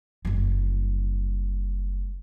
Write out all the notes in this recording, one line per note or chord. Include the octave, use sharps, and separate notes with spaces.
F#1 G3